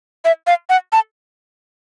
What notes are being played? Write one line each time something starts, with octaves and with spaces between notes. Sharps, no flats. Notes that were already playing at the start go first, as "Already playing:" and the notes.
E5
F5
F#5
A5